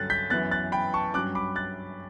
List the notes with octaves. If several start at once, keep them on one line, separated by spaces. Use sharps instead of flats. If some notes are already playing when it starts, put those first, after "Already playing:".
Already playing: G2 D3 F#3 C#4 F#6 A6
G6 B6
F#2 E3 B3 F#6 A6
F#6 A6
G5 B5
A5 C#6
G2 F#3 C#4 D6 F#6
B5 D6
F#6 A6